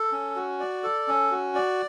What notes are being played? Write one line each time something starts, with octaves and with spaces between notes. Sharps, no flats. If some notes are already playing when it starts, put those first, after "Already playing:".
Already playing: A4
C#4
F#4
D5
A4
C#4
F#4
D5